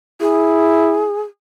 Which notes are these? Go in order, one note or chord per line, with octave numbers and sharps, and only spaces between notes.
E4 G#4